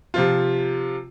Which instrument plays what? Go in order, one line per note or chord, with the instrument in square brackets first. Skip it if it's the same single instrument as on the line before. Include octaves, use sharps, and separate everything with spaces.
[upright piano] C3 F3 F4